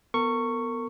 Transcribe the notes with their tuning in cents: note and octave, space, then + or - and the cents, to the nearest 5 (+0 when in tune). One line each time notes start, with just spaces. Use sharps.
B3 +0 A#4 -40 C#6 +0